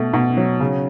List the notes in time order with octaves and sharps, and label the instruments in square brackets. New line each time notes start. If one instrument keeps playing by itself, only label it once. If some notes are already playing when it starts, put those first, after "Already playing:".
Already playing: [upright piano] B2 A3
B2
F#3
C#3